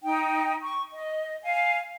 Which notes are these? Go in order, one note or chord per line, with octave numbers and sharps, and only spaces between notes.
D#4 G5
C#6
D#5
F5 G#5